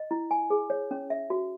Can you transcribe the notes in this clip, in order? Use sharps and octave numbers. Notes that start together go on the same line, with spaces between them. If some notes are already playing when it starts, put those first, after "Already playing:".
Already playing: D#5
E4
G#5
G#4
C#5
C#4
E5
F#4